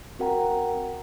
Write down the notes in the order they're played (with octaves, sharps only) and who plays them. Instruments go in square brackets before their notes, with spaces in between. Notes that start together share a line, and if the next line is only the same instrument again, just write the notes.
[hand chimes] C4 F#4 A#4 F#5 G5 A#5